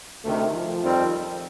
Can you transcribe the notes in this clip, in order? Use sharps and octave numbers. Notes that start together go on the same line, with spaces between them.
D2 C3 D#3 A3
F3
F2 D#3 G3 C4